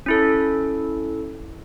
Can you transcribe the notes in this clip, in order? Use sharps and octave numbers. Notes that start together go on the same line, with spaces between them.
C#4 E4 A4